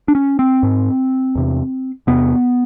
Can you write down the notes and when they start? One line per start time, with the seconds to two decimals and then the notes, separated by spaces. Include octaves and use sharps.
0.08 D4
0.15 C#4
0.39 C4
0.63 G#2
1.35 E2 C3
2.07 E2 C3 B3